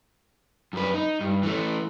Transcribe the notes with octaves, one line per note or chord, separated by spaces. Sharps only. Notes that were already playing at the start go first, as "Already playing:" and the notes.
F#2 B4
D#4
G2
E3 A3